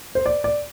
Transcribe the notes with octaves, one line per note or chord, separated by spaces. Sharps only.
C5
D5
D5